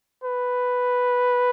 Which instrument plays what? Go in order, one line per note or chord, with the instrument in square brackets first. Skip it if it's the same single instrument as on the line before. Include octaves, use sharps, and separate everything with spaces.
[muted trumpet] B4